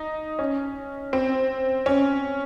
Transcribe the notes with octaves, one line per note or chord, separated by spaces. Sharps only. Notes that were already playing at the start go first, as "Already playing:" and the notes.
Already playing: D#4
C#4
C4
C#4